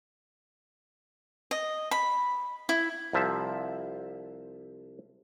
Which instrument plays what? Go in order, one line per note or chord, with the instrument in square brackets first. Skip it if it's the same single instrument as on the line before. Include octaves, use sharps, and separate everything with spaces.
[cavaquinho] D#5
B5
E4
[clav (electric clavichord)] C2 F3 E5